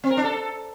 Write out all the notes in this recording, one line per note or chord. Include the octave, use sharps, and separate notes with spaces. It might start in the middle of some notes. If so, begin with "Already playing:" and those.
C4
A#4
D4
A4